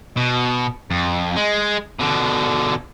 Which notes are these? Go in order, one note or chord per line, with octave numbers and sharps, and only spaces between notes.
B2
F2
G#3
B2 D3